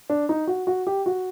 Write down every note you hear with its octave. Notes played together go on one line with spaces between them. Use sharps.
D4
D#4
F#4
F#4
G4
F#4